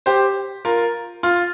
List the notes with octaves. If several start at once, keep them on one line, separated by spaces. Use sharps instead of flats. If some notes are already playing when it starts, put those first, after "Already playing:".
G4 C5
F4 A#4
F4